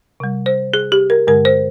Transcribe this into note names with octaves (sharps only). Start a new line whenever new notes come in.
C3 G3
C5
G#4
G4
A#4
G2 D3 G#3 A#4
C5